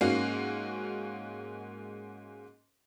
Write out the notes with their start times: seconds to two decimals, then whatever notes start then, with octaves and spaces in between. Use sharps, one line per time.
0.01 G#2 A#3 C#4 F#4 C7